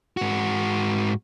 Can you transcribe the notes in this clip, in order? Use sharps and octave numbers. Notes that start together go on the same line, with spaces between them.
G#2 F#4